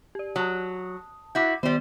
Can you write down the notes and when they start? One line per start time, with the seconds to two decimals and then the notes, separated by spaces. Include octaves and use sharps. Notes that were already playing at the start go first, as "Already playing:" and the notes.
0.15 G4 D5
0.36 F#3 A5 D#6
1.35 E4 F#4 D6 G6
1.63 D#3 G3 B3 C5